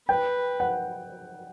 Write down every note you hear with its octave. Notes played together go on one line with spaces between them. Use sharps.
B4 G5
F#5